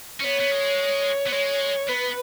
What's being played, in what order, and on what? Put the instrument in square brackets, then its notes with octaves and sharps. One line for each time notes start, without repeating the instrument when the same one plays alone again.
[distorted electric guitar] C#4
[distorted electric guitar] B3 [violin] C#5
[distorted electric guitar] B3
G#3
B3
[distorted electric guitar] G#3 [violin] C#5
[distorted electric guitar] B3 [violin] B4